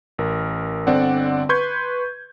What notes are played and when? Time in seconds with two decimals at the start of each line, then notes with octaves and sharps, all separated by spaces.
0.18 A1 A#4
0.87 G1 D3 C4 D5 F#5
1.49 B4 C6 C#6 G6 G#6